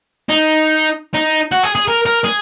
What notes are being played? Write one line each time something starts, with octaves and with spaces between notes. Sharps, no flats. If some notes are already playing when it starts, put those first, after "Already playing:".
D#4
D#4
F#4
G#4
G#4
A#4
A#4
G#4